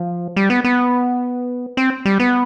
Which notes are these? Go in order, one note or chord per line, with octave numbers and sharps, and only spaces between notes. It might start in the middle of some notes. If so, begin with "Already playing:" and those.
Already playing: F3
G3
B3
B3
C4
G3
B3